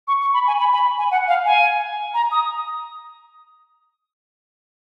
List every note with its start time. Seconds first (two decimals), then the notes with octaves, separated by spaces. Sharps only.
0.08 C#6
0.21 C#6
0.34 B5
0.47 G#5
0.59 B5
0.73 B5
0.99 G#5
1.11 F#5
1.28 F5
1.45 G#5
2.14 A#5
2.32 D#6